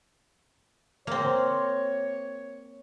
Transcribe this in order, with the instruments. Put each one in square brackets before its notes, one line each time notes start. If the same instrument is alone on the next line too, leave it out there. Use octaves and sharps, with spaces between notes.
[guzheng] A#3 C4 [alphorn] C#5